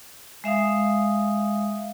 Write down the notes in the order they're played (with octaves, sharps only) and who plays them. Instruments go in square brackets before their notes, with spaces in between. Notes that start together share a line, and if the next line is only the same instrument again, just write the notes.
[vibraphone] G#3 E5 F5 D#6